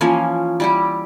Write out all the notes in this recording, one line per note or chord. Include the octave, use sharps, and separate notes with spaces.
E3 F3 A#3 C#4
G3 E4 G4